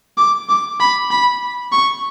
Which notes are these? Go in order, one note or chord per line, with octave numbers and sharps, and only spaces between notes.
D6
D6
B5
B5
C#6